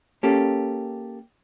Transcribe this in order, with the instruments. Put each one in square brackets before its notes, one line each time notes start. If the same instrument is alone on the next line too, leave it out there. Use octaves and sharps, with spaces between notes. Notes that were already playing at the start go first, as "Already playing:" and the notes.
[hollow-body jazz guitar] A#3 C#4 G4 A4